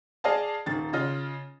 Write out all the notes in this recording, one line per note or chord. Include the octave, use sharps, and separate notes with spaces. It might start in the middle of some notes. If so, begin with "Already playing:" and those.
G#4 D5 D#5 F5 A5
D#1 D#3 A6
C#3 F4 D#5